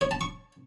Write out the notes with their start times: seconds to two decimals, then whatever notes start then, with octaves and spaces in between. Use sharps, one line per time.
0.01 C#5
0.11 A5
0.21 C#6